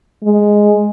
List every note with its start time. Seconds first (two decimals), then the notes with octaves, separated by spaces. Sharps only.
0.24 G#3